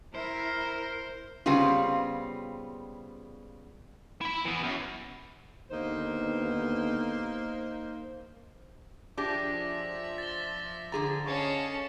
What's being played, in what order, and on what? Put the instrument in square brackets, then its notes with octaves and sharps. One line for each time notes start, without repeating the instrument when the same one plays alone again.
[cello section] E4 [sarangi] A#4 [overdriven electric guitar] C5
[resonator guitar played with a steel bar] C#3 G3 B3 C4 F4
[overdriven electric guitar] E4 B5
E3 B3
F#2
[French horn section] D#2 D3 B3 [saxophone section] A#3 D#4 C5
[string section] F3 E5 [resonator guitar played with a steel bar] D4 G4 G#4 [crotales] D6 A#6
[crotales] A6 G7
[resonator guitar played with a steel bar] D3 G#4 A#5 [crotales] A6
[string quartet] C#4 A5 [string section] D#5 F5 [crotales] C#6 C#7